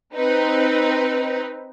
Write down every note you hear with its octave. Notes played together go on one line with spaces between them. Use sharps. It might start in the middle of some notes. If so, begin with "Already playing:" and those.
C4 D#4 B4